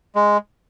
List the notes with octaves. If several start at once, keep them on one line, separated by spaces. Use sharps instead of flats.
G#3